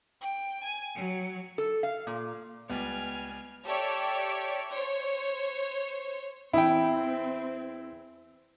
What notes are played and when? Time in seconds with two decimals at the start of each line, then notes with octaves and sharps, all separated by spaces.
0.21 G5
0.63 G#5
0.94 F#3
1.58 A4
1.83 F5
2.07 A#2
2.70 C#2 G3 B3 G#5 F6
3.64 G4 A4 C#5 D5 E5
4.71 C5 C#5
6.53 E2 C4 E4 G5